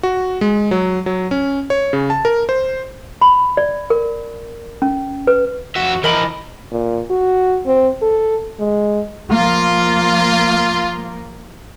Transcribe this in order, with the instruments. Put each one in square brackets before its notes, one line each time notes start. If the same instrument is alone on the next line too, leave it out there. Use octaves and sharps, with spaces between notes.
[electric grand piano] F#4
G#3
F#3
F#3
C#4
C#5
C#3
A5
A#4
C5
[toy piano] B5
D5
A#4
C#4
B4
[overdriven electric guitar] F2 E5 [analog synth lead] F#4
[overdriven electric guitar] E3 F3 [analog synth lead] A#4 [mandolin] D#5 B5 D6
[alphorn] A#2
F#4
C4
A4
G#3
[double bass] F3 A#3 [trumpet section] F4